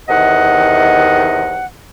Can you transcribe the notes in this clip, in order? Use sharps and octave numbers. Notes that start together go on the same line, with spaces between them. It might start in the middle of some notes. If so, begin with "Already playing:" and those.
E2 C3 D#3 D#5 F#5